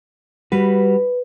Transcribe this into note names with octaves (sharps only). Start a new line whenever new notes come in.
G3 F#4 B4